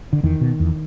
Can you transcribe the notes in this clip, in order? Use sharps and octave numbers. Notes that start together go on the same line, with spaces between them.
D3
E2 D#3
B2
E2